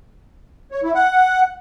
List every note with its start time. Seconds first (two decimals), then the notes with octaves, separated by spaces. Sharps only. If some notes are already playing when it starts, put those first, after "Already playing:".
0.72 C#5
0.83 E4
0.95 F#5